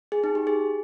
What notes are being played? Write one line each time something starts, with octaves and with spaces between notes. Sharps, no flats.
G#4
D#4
G4
G#4